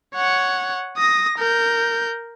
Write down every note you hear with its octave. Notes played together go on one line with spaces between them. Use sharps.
C#5 F#5
D#6 A#6
A#4 G6